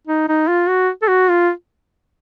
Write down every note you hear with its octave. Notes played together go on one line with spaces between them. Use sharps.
D#4
D#4
F4
F#4
A4
F#4
F4